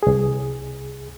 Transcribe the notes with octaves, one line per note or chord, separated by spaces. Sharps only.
C2 G#4